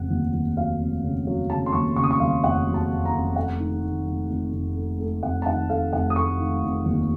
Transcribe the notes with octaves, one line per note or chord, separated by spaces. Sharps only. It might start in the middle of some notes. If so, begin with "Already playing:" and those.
Already playing: F1 C#3 F#5
D#2
D#2
F#3 F5
F1
C#3
F#3
C#3 A5
C6
D#2 C#6
C#3 C#6
D#6
C#6
D#2 F5
F1 F#5
F#3
A5
F1
A#5
F1
A3 F#5
D#3
D#3
F1
F1
F1
A3
A3
F1 F#5
A5
D#3 F#5
A3 F5
F1 F#5
D#6
A3 C#6
D#3
F1
D#2